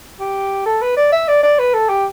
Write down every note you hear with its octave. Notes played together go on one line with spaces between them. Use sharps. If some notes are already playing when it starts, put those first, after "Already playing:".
G4
A4
B4
D5
E5
D5
D5
B4
A4
G4